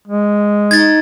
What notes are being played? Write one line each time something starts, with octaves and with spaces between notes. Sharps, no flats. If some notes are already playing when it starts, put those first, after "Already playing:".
G#3
D#4 G#6 A6